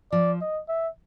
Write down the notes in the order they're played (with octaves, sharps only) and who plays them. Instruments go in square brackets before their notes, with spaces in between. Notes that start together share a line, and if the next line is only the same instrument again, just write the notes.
[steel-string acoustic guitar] F3 [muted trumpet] D5
[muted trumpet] D#5
E5